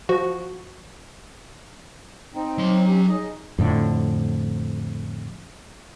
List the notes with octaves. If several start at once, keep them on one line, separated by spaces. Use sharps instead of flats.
F3 F#4
C4 D#4
F#3 C6
C#4 G4
D#4 G#4 D#5
F2 A2 D3